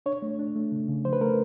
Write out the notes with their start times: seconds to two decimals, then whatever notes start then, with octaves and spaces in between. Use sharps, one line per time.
0.06 D4 C#5
0.22 A3
0.39 D4
0.56 A3
0.72 C#3
0.88 C#3
1.05 F3 C5
1.13 B4
1.21 A3 A#4